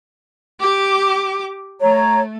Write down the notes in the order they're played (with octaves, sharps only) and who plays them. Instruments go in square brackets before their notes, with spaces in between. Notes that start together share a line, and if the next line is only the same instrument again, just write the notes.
[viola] G4 D6
[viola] A3 [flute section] C#5 A#5